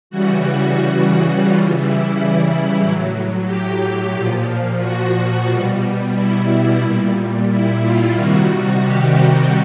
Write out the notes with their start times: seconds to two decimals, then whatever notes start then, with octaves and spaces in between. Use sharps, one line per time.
0.10 C#3 E3 G3 F#4
1.44 C#3 E3 G3 F4
1.77 E4
2.79 A2 F#3
3.45 G4
4.12 A#2 F3
4.80 F#4
5.48 B2 G3
6.15 E4
6.48 E4
6.81 A#2 G3
7.49 E4
7.83 F4
8.16 C3 D#3 G3 F#4
8.83 G4
9.16 F#4